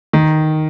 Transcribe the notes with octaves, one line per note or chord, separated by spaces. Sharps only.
D#3